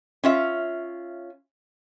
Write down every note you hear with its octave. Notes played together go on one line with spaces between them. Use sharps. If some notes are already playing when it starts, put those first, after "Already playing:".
C#4 F4 E5